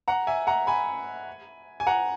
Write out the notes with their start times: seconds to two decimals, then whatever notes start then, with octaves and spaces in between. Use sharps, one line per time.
0.08 F#5 A#5
0.27 E5 G#5
0.47 F#5 A#5
0.67 G#5 B5
1.80 G#5
1.87 F#5 A#5